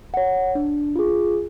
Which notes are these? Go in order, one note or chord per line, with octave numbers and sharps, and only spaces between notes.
C#5 F#5
D4
F4 G#4